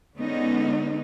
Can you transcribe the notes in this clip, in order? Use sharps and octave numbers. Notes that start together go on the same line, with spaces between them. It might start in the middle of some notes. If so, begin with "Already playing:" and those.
D3 G#3 B3 C#4 D#4